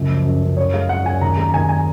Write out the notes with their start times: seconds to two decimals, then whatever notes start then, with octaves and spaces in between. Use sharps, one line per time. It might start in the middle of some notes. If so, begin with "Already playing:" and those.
Already playing: C#2 F#2
0.09 F3
0.26 F#2
0.42 F#2
0.57 F#2 C#5
0.74 G#3 F5
0.89 F#2 F#5
1.05 F#2 G#5
1.21 D#2 A#5
1.37 G#3 A#5
1.49 A#5
1.54 D#2 G#5
1.69 G#5